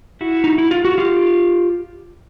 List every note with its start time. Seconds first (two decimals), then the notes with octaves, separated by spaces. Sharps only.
0.21 E4 F#4
0.44 D#4
0.58 E4
0.71 F4
0.85 F#4
0.98 F4 G4